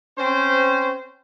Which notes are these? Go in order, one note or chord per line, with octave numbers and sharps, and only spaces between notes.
C4 C#4 C5